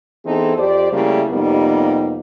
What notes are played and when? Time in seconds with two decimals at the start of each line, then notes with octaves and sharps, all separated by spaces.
0.25 E3 B3 C4 D#4 G#4 A4
0.58 F2 G4 C5 D5
0.92 C#3 G3 A3 A#3 E4
1.30 F2 C3 G3 A#3 B3 D#4